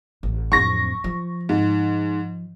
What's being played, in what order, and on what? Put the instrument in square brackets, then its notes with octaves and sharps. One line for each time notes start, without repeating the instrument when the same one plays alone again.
[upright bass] A1
[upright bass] D1 F2 [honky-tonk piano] C#6 A#6
[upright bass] F3
[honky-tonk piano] G#2